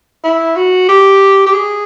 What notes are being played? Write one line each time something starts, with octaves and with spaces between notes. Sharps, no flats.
E4
F#4
G4
G4
G#4